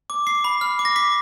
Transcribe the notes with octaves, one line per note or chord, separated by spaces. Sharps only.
D6
D6 C7
B5
F6
D6
A#6
D6 B6